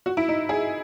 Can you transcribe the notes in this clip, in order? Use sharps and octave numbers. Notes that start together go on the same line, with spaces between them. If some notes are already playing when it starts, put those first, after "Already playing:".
F#4
E4
D#4
G#4